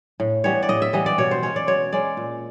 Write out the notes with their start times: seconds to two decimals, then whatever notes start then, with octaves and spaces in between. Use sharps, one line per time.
0.20 A2
0.44 E3 G3 B3 C#5
0.63 D5
0.69 A2 D#5
0.82 E5
0.93 E3 G3 B3 D#5
1.06 D5
1.18 B2 C#5
1.31 C5
1.42 G#3 C#4 C#5
1.56 D5
1.67 B2 C#5
1.93 G#3 C#4 D5
2.17 A#2